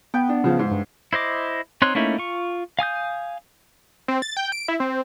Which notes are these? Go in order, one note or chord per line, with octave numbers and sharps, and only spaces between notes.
B3 G5
D4
C#3 F3
G#2
G2
E4 C5 D#5 D6
C4 D#4 C#5 C6 F#6
A3 A#3 C#4 D#4 E4
F4 C#6
F5 G#5 D#6 G6
C4
A6
G5
D7
E4
C4